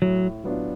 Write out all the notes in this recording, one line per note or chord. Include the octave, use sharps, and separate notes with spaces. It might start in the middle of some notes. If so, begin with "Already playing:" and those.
A2 F#3
F#3 B3 D4 F4